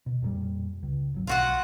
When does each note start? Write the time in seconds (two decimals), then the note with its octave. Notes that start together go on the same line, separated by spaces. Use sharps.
0.06 B2
0.22 F2 A#2 G3
0.83 C#2
1.14 G#1 F#3
1.27 B1 F4 F#4 F#5